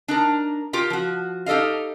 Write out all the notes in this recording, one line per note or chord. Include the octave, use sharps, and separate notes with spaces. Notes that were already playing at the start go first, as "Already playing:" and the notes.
D4 D#4 A#4
F4 G4 A#4 G5
F3 F#4
D#4 G4 A4 D#5 F5